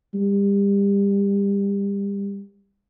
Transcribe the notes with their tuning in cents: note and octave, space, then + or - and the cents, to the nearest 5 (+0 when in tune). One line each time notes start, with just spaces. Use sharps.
G3 +30